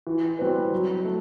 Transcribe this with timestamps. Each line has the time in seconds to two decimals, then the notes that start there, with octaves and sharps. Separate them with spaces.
0.07 E3
0.39 G3 C4 F#4 B4
0.72 F#3
1.05 A3